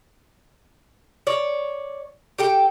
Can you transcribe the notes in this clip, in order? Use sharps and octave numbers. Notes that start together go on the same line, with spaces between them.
C#5 D5
G4 A4 G5